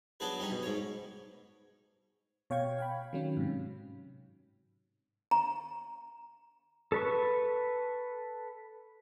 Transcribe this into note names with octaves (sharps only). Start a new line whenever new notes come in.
F#3 B3 D4 G#4 B4
G3 C#4 D#4
B2
G#2 C#5
B2 C#5 F5 G5 C#6 G#6
F5 G5 B5
D#3 F#3 C#4
G#2 C3
A#5
A4 B4 C#6